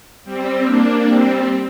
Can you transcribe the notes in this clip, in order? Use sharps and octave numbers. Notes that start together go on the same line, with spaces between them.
G3 C4
A#3 D4
G3 C4